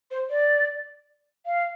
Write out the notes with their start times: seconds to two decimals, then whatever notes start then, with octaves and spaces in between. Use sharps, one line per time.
0.11 C5
0.30 D5
1.46 F5